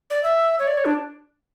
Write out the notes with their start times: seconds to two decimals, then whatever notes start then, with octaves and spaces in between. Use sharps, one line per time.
0.10 D5
0.23 E5
0.59 C#5
0.67 D5
0.77 C#5
0.85 D4